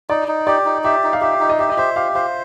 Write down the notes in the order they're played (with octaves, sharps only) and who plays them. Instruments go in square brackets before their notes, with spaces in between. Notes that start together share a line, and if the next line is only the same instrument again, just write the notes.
[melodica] D#4 [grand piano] D5
[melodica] D#4
[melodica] G4 [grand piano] D5
[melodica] D#4
[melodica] G4 [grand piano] E5
[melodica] D#4
[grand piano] F5
[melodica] G4 [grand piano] E5
[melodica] D#4
[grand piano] D#5
[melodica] G4 [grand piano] E5
[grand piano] D#5
[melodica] C5 [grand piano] E5
[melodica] G4 [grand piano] F5
[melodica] C5 [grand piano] F5